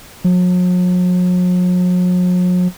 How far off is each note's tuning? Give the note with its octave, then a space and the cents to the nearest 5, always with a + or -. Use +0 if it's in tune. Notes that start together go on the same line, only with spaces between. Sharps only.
F#3 -45